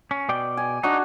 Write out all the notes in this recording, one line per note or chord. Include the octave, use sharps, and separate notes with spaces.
C#4
B2 D5 G5
G#5
D4 D#4 F#4